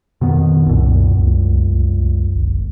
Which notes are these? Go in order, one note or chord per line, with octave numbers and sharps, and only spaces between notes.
F2 B2 D#3 B3
C2 F#2 A#2
C#2
G1